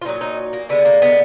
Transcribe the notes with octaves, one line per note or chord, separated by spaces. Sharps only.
F4
A#2 F#3 D#4
D#4
A#3
D3 G#3 B3
A#3
B3